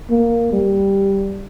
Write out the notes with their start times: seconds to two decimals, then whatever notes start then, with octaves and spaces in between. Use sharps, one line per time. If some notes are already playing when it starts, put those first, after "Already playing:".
0.11 A#3
0.53 G3